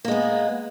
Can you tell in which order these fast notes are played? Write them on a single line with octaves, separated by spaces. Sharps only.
A#3 G#3 B3